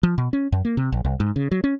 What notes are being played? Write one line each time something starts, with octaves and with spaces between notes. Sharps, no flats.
F3
B2
C#4
F#2
A#3
C3
A#1
C2
G#2
C#3
F#3
C#4